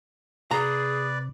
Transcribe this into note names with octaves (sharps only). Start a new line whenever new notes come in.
C3 G#4 B4 D5 A#5